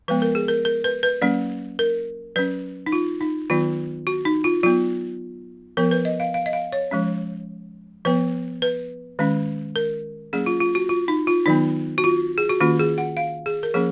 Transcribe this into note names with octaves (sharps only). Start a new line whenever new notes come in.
F3 G#3 B3 B4
A#4
G#4
A#4
A#4
B4
B4
F#3 A#3 C#4
A#4
F#3 C#4 B4
D#4
F4
D#4
D#3 F#3 B3 F4
F#4
D#4
F4
F#3 B3 F4
F3 B3 A#4
B4
D#5
F5
F5
D#5
F5
C#5
F3 G#3 C#4
F3 B3 B4
B4
D#3 G#3 C#4
A#4
F#3 A#3 C#4 G#4
F4
F4
F#4
F4
D#4
F4
D#3 F#3 B3 D#4
F#4
F4
G#4
F#4
D#3 A#3 C#4 F4
G#4
F#5
F5
G#4
A#4
F3 A#3 C#4 G#4